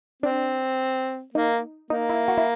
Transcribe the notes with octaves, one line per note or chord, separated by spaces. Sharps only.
C4 D4
A#3 D#4
A#3 D#4
E4
F#4
E4